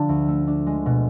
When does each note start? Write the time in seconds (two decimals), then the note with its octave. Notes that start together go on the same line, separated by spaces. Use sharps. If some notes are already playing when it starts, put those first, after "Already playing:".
Already playing: D3 F3 D4
0.09 D2
0.28 A3
0.47 D4
0.67 G#3
0.86 B2